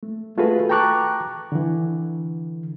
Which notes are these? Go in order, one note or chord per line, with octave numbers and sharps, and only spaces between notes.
A3
A3 F4 F#4 G#4 A4 B4
G5 A5 A#5 C#6 D6 F#6
D3 E3